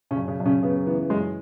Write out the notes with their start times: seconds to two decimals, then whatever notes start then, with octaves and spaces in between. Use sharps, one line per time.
0.11 C#3 C#4
0.17 F#2
0.28 C#3 C#4
0.40 F#2
0.45 C#3 C#4
0.63 C#3 B3
0.87 E3 B3
1.10 F#2 G#3